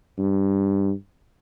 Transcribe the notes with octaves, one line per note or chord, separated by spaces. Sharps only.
G2